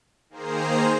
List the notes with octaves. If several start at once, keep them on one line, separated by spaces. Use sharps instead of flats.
D#3 A#3 G#4 C5 A#5 C7